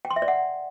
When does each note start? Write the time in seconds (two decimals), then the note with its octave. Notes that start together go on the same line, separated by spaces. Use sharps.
0.05 G5
0.10 C6
0.16 E5
0.22 D5
0.28 F#5